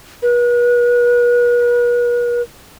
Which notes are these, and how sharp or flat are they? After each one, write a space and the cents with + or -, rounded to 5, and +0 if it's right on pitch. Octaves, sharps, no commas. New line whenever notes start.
B4 -40